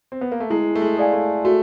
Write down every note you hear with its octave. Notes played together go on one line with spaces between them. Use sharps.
C4
B3
A#3
A3
G#3 E4
A3
G#3
A4 D5 F5 G#5
A3
A3 F#4